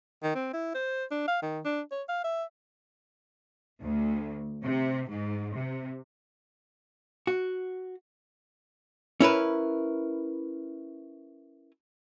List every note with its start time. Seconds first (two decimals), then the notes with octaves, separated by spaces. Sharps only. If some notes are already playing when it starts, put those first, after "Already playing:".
0.23 D#3
0.35 C4
0.54 E4
0.74 C5
1.11 D4
1.28 F5
1.42 D#3
1.65 D4
1.92 C#5
2.09 F5
2.24 E5
3.82 D2
4.64 C3
5.09 G#2
5.55 C3
7.27 F#4
9.20 C#4 E4 A#4 B4